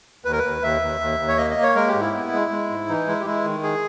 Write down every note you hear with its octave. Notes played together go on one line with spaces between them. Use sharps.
D#2 B4
A#4
B4
D#2
D#2 E5
D#2
D#2
D#2
C#5
A#3 D#5
D#5
A#3
C#5
G#3 A#4
G4
G#2
E4
B3
G#3
G#3
G#2
E3 D#4
G#3 E4
G4
G#3 E4
D#3
G#4